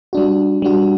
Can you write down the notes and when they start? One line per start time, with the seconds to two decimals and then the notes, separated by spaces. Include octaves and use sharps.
0.13 G3 D4 F#4
0.62 G3 D4 F#4